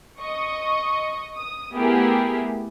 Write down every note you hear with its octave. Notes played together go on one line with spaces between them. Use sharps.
D#5 C#6 D#6
D#6
A3 B3 E4 G4 G#4 A#4